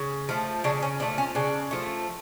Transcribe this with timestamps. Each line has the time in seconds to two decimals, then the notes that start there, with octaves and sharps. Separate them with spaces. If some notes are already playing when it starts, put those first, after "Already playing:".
Already playing: C#3
0.29 F3 A3
0.64 C#3 D4
0.83 C#4
1.00 F3 A3 D4
1.18 C#4
1.35 C#3 D4
1.71 F3 A3